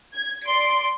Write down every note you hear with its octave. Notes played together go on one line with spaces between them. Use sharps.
G#6
D5 C6 D7